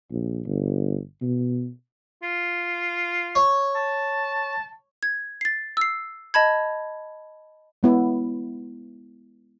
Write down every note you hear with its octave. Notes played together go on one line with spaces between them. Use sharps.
A#1
G1
B2
F4
C#5
A5
G#6
A6 C7
E6 C7
D#5 A5 B5 G#6
G#3 B3 E4